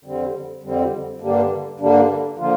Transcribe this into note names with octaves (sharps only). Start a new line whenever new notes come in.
F2 D3 G3 C4
F2 D3 G3 C4
G2 D3 G3 A#3 D4
G2 D3 G3 A#3 D4
D3 F3 A#3 F4